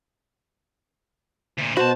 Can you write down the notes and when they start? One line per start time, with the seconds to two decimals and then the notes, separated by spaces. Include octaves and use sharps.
1.58 D2 A#2
1.77 B2 F#4 C5 A5 B5